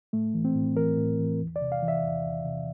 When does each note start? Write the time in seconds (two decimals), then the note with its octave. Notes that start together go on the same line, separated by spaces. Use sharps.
0.13 A2 A3
0.34 E3
0.45 C4
0.56 A2
0.76 E3 A#4
0.97 A2
1.19 E3
1.40 E2
1.56 D5
1.61 C3
1.72 F5
1.82 E3
1.88 E5
2.03 E2
2.25 E2
2.45 C3